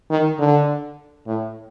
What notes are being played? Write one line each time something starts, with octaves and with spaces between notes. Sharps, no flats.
D#3
D3
A2